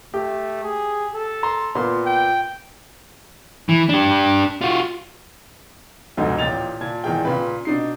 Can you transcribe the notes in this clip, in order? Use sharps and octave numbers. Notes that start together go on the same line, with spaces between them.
A3 G4
G#4
A4
A#5 C6
A#2 B3 C6
G5
E3
D4 G4
F4 F#4
F1 D2 G#2 B2
A1 A#2 G5 A6 F7
A#2 D5 A5 G#6
G#1 E2 A#2 G#4 G5
A#2 C#3 B4
B2 D4 D#4 C7